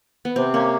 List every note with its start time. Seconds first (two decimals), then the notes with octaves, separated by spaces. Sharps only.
0.25 B3
0.36 C3 C4
0.54 A#3 C#4